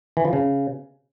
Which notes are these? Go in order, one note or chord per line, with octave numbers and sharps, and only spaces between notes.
E3
F3
C#3